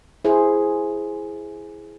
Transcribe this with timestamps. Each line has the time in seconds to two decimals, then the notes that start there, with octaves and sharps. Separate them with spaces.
0.25 E4 G#4 C5